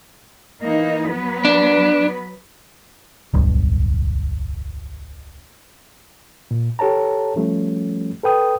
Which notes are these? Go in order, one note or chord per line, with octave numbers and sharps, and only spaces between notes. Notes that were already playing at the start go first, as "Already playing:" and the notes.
E3 A#3 D#4
F#3 B3 B4
D4
D1 B1 G2
A#2
G4 A4 C#5 A5 A#5
F3 G3 A3 C#4
A4 B4 G5 D#6